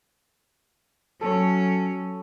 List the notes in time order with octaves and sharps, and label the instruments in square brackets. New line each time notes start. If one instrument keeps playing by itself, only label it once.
[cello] F#3 C#4 [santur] A4 C#5